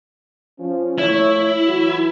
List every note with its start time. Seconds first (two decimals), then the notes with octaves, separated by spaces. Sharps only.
0.59 F3 C#4
0.98 A#2 A3 E4 C#5
1.68 E3 F#3 F#4